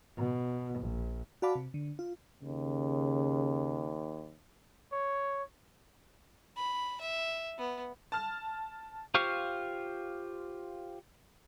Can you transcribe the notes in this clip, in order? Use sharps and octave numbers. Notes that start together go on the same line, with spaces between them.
B2
A#1
F#4 D5 F5 A5 B5 D6
C3
D3
F4
D#2 C#3
C#5
B5
E5
B3
A5 F6
F4 G4 C5 F5 C#6